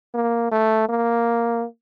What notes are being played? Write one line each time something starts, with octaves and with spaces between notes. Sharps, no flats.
A#3
A3
A#3